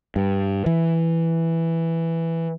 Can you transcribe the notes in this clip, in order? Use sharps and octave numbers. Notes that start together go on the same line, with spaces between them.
G2
E3